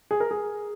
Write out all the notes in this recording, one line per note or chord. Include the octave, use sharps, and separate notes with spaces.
G#4
A#4
G#4